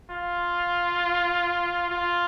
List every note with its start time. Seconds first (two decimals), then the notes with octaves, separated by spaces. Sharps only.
0.11 F4
1.90 F4